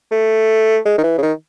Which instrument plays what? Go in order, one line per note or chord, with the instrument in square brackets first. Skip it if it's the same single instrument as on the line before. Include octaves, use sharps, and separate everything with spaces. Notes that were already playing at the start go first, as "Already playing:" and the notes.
[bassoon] A3
G#3
D#3
E3
C#3
D#3